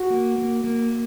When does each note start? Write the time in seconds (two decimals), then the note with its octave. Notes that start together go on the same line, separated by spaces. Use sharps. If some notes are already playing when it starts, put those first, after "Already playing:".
Already playing: F#4
0.10 A#3
0.38 A#3
0.64 A#3